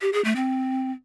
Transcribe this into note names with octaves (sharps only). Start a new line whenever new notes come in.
G4
G#4
A3
C4